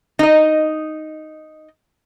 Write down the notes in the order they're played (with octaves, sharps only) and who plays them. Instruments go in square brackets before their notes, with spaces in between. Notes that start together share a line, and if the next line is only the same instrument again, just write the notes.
[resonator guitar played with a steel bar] D#4 D#5